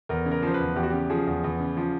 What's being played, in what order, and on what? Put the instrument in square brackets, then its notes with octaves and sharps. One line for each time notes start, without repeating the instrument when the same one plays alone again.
[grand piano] E2 A#4
C#3
A#4
F3 C5
B4
E2
E2 G4
F#4
C#3 G4
F3 G#4
E2
E2
C#3
F3